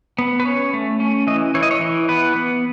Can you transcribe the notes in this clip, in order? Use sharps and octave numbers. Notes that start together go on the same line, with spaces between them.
B3
B4
C#4 C#5
A3
C#4
E3 D#5
E3 C#5
D#5
C#5
E3
B3 B4
B3